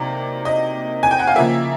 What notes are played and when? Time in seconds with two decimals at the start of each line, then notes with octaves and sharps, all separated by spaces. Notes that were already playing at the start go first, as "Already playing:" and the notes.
Already playing: C3 D#3 F#3 A#3 D5
0.45 D#5
1.03 G#5
1.11 G5
1.19 F#5
1.27 F5
1.36 C#3 F3 A#3 E5